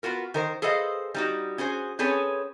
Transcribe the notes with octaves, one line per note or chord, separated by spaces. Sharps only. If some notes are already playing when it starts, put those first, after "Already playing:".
B3 F4 F#4 A#4
D#3 A#4 C5
G#4 A4 B4 C5 D#5 F5
G3 D#4 F#4
C#4 F#4 G#4 C5
C4 C#4 G#4 A4 B4 C#5